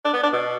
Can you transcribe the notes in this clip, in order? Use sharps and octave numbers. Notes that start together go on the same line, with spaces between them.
D4
B3
D4
B2